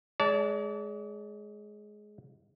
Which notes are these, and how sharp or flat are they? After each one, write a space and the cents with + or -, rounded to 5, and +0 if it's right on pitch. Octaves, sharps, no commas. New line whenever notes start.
G#3 +15 D5 -45 A5 +0